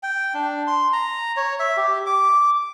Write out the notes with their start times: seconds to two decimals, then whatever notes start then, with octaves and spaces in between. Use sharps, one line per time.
0.03 G5
0.34 D4
0.67 C6
0.93 A#5
1.37 C#5
1.59 E5
1.77 G4
2.06 D6